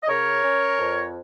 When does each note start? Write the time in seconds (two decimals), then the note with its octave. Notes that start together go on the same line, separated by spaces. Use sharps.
0.03 D#5
0.08 C#3 A#4 C#5
0.43 C#4
0.79 F2